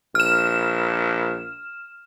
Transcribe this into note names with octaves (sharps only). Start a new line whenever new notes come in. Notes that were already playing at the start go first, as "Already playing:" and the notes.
A#1 F6 E7